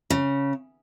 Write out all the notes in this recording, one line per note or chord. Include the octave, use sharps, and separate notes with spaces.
C#3